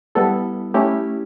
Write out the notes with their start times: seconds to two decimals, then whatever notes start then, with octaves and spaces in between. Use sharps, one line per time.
0.15 G3 B3 E4 A4
0.74 A3 C#4 E4 G4